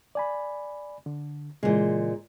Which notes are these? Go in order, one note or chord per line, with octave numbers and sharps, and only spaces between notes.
D5 G#5 B5
D3
A#2 C#3 E3 G#3